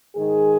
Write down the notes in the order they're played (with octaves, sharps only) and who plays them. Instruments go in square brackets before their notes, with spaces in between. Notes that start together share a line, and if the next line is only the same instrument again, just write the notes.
[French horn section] G#2 D#3 G#4